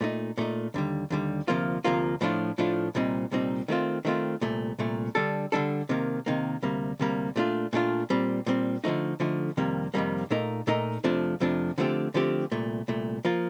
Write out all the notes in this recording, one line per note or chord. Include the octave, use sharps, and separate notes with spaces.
A#2 A3 D#4
A#2 A3 D#4
D#2 D3 G3
D#2 D3 G3
D2 C3 F3 A#3 F4
D2 C3 F3 A#3 F4
A2 F3 A3 D4 F4
A2 F3 A3 D4 F4
C2 A#2 G3 C4 D#4
C2 A#2 G3 C4 D#4
D#3 A3 C4 F4
D#3 A3 C4 F4
C2 A#2 A3
C2 A#2 A3
D3 G3 D4 A4
D3 G3 D4 A4
C3 D#3 A#3
C3 D#3 A#3
D2 C3 G3 A#3
D2 C3 G3 A#3
A#2 A3 D4 F4
A#2 A3 D4 F4
A#2 G3 C4
A#2 G3 C4
D3 F3 A3 D#4
D3 F3 A3 D#4
F2 C3 D#3 G3 A#3
F2 C3 D#3 G3 A#3
A#2 A3 D#4 A#4
A#2 A3 D#4 A#4
F2 C3 F3 A3 D4
F2 C3 F3 A3 D4
D3 F3 A3 C4 G4
D3 F3 A3 C4 G4
C2 A#2 A3
C2 A#2 A3
F3 A#3 F4